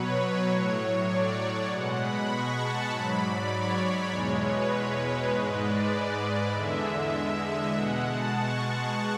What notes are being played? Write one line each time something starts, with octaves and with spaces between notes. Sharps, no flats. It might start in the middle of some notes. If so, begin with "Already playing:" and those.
Already playing: B2 F#3 B4 C#5
A2 F#3 C#5
D5
B2 G#3 F#5
B5
C#6
A5
G#2 F#3 B5
D5
C#5
E2 B2 G#3
B4
G#2 G#3
D5
D5
E2 D3 G#3 E5
B2 G#3 F#5
A5
C#6